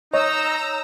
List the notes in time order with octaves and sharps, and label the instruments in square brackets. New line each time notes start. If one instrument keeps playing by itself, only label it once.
[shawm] D#4 [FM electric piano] C#5 [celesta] D#5 [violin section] A#5 E6